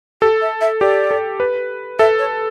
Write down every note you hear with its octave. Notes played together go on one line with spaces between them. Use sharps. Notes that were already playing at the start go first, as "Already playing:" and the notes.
G4 A4
E5
E5
G4 D5
A4
B4
A4 E5
C#5